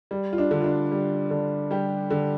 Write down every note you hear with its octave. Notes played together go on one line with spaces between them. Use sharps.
G3
F4
D4
D3
F4
D4
G3
D3
G3 G4
D3